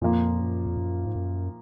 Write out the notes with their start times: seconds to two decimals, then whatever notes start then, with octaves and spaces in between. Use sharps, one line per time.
0.01 F2 A#2 F3 A#3 F4
0.39 F#2
0.66 F2
0.77 F#2
1.06 G#2
1.15 F#2